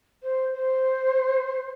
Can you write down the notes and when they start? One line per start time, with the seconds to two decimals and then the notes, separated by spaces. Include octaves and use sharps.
0.23 C5
0.54 C5